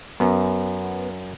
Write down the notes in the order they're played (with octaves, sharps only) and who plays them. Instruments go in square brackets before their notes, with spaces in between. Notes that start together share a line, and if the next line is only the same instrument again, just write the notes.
[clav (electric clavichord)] F#2 [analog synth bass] B3